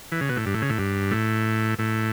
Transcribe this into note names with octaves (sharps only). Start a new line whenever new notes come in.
E3
C#3
B2
A2
G2
A2
C#3
A2
G2
A2
A2